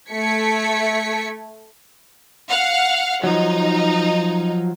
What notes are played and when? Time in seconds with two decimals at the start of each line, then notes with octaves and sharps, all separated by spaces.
0.11 A3 G#6 B6 C#7
2.49 F5 F#5
3.24 F3 F#3 D#4